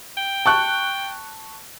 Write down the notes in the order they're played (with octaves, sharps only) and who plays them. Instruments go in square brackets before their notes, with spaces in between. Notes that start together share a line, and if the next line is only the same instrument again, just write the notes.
[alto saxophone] G5
[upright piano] A5 C#6 F#6